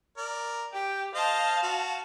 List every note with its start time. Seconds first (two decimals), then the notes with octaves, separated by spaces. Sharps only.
0.17 A#4 D5
0.73 G4 G5
1.15 C5 D#5 F5 A5
1.63 F#4